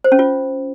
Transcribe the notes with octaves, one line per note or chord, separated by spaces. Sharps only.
C5
C#4
F4